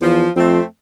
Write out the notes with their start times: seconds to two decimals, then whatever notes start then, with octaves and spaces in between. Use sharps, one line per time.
0.01 E2 F3
0.36 F2 A3 C4